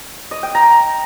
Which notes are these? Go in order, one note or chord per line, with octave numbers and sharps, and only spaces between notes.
D#5
G5
A#5